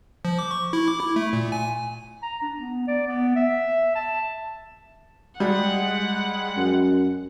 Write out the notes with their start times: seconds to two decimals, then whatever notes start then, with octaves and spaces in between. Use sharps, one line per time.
0.25 F3
0.39 D6
0.51 C#6
0.73 E4
0.88 D6
1.01 E4
1.16 A3
1.33 A#2
1.52 G#5
2.23 A#5
2.42 D4
2.56 B3
2.88 D5
3.07 B3
3.35 E5
3.95 A5
5.40 G3 G#3 F#5
6.57 F#2